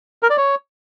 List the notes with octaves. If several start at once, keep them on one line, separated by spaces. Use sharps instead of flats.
A#4
D5
C#5